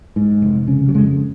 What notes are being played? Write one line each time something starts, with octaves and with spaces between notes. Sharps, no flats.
G#2
F1
C#3
F#3
F2 G#3